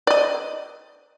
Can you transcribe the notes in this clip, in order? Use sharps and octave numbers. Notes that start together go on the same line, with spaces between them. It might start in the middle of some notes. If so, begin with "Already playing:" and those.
D5 D#5